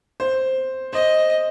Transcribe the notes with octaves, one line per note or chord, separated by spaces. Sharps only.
C5
C5 D#5